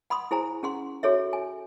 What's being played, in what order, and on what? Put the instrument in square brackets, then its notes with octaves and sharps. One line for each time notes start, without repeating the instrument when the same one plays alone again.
[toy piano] F#5 B5 C6 D#6
E4 G#4 C5 G#5 A#5
C#4 G#4 F#5 C6
F#4 G#4 A4 C#5 E5
G#5